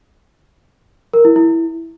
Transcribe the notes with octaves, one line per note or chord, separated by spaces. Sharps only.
A#4
E4
E4